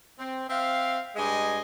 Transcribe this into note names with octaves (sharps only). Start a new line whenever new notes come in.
C4
C4 E5 F5
G2 G#3 D#5 G#5